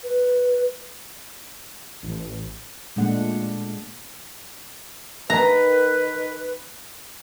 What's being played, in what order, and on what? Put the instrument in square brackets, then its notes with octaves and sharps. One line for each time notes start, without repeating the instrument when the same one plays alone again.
[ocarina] B4
[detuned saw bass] A1
[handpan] A#2 G#3 A3 D4 F#5
[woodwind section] D#3 B4 [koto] A#5